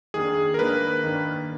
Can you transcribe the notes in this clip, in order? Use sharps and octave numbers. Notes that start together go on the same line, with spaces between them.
D#3 A#3 D4 G#4
A#4
D#3 A#3 D4 B4
D#3 A#3 D4